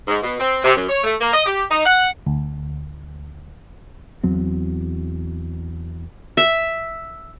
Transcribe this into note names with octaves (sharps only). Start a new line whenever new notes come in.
G#2
B2
C4
C3
F#2
C#5
A3
A#3
D#5
G4
D#4
F#5
D2
E2 F#3 C4
E5